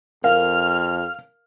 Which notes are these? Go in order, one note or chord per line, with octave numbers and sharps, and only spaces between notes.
F2 A#4 F5 F6